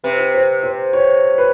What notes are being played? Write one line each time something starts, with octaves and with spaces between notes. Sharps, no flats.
C3 B4
C5
C5
C#5
B4